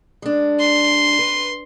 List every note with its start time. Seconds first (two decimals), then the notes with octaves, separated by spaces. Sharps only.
0.22 G#3 D4
0.61 C6
1.19 B4